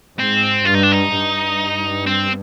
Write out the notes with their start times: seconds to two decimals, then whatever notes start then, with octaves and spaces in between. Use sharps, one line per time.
0.18 G#2 C4
0.65 G2 F4
0.75 D#4
0.84 D4
0.92 D#4
1.13 G2
2.07 C4